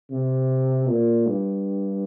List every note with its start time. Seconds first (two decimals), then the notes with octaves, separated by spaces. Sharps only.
0.11 C3
0.89 A#2
1.27 G2